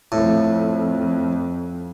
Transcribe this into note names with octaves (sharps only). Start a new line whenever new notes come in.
F2 A2